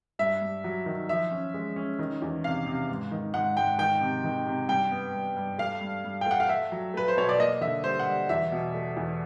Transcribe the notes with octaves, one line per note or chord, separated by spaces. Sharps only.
G2 E5
G2
F#3
D#3
F3 E5
C#4
G#3
C#4
D#3
E2
C3 F5
C3
G#2
D#3
G#2 F#5
G#2 G5
D#3 G5
C3
D#3
C3
G2 G5
B3
G2
G2
A3 F5
G2
G2
G5
A3 F#5
F5
A3 E5
F#3
A3 B4
C5
B2 C#5
D5
A#3 D#5
D3 E5
G3 C5
F#5
G3
E2 E5
B2
A3
E2